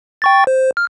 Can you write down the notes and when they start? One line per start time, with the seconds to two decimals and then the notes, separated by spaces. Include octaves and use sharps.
0.22 G5 C#6 A6
0.47 C5
0.77 F6